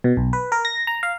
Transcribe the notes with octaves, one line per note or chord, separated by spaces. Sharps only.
B2
B1
B4
A#4
A#6
A#5
F5